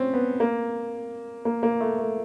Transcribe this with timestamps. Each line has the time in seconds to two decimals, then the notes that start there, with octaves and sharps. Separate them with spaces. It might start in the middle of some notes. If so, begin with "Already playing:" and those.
Already playing: C4 C#4
0.14 B3
0.40 A#3
1.45 A#3
1.63 A#3
1.80 A3
1.98 A3